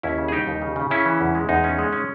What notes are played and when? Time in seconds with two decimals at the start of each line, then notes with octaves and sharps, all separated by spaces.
0.03 D#2 C#4 E4
0.18 C#3
0.28 G#4
0.32 G3 D#4 G4
0.47 D#2
0.62 C#3
0.76 C#3
0.91 C#3 C#4 E4
1.06 E3
1.21 E2
1.35 G#3
1.49 E2 D#4
1.64 C#4
1.79 G#3
1.93 C#4